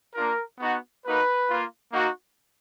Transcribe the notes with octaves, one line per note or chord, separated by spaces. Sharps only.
A#3 D4 F4 A#4
B3 D#4 F#4
A#3 D#4 F#4 B4
A#3 F4
A#3 D#4 F#4